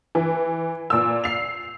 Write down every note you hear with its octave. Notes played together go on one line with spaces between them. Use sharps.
E3
A#2 E6
C7 F7